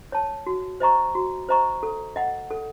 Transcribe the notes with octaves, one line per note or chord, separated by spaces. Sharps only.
C#5 A5
F#4
C5 D#5 A#5 C#6
F#4
C5 D#5 A#5 C#6
A4
D#5 F#5
A4